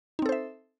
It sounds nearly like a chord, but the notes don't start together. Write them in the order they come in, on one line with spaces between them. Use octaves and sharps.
D#4 C4 A4 C5 E5